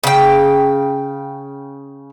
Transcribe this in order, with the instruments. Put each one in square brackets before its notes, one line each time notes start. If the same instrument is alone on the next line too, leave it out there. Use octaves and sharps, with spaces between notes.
[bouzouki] C#3 G5